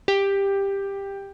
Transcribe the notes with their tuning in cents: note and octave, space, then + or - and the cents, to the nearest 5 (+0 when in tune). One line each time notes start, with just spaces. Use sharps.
G4 +10